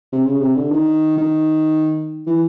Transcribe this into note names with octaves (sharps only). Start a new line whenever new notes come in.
C3
C#3
C3
D3
D#3
D#3
E3